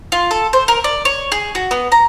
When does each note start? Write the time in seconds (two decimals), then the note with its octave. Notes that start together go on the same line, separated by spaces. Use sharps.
0.12 F4
0.31 A4
0.53 C5
0.68 A#4
0.84 D5
1.05 C#5
1.32 G#4
1.55 F#4
1.71 B3
1.92 A#5